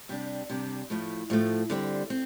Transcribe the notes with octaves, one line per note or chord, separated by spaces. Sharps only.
C3 G3 D4
C3 G3 D4
A2 F3 A3
A2 F3 A3
D3 G3 C4
C4